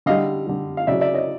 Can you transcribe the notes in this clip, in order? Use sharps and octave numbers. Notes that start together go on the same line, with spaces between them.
D3 G3 D#5 F5
D3 G3
F5
C#3 F#3 D5 E5
D5 E5
C#5 D#5